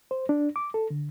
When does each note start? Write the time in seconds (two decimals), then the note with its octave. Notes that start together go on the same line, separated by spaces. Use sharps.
0.11 C5
0.29 D4
0.56 D6
0.74 A4
0.90 D3